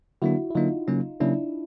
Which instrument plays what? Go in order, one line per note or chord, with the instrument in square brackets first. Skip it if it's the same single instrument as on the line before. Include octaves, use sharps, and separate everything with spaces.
[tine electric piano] D3 F#3 A#3 D4 [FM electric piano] E4 F#4
[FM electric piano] E4
[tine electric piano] D3 F#3 A#3 D4 [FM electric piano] D#4 F4
[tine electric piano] C#3 F#3 A#3 C#4
[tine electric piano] C#3 F#3 A#3 C#4 [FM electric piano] D4 E4